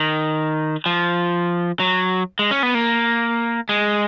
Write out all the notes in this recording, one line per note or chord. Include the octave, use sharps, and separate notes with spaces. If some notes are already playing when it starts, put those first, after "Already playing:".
Already playing: D#3
F3
F#3
G#3
C#4
B3
A#3
G#3